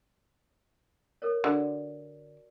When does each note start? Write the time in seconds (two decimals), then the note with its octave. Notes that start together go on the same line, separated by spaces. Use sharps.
1.22 A4 A#4 C#5
1.44 D3 F#4 D5